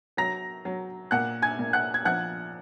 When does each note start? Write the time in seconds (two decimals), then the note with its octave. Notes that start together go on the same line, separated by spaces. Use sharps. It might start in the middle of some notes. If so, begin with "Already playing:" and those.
0.17 F#3 A#5 A#6
0.65 F#3
1.11 A#2 F#5 F#6
1.42 G#5 G#6
1.59 A#2
1.73 F#5 F#6
1.94 G#6
2.05 F3 F#5 F#6